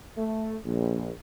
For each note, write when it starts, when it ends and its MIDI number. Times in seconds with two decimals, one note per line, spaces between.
0.17 0.56 57
0.65 1.11 34